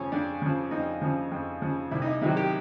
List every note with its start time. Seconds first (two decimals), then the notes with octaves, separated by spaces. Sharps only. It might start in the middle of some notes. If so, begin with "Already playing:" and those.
Already playing: F2 C#3 F3 C#4
0.12 F2 D4
0.42 C#3 F3
0.71 F2 D#4
1.01 C#3 F3
1.31 F2
1.62 C#3 F3
1.91 C2 E4
2.02 D#4
2.07 E4
2.22 C3 D#3 F#3 E4
2.37 G4